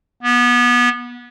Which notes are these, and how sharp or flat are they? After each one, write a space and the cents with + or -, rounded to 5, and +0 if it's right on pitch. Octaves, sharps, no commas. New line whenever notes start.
B3 -25